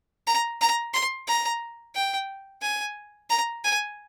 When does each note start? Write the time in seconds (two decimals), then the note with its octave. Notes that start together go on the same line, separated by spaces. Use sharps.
0.27 A#5
0.61 A#5
0.94 C6
1.27 A#5
1.95 G5
2.62 G#5
3.30 A#5
3.64 G#5